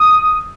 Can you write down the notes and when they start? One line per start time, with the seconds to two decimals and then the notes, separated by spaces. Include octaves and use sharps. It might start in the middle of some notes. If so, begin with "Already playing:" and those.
Already playing: D#6